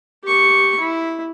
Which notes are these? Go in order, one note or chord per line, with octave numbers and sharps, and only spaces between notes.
G4 C#6
E4